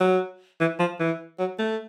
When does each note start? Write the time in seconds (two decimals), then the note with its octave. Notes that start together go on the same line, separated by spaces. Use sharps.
0.01 F#3
0.60 E3
0.79 F3
1.00 E3
1.39 F#3
1.59 A3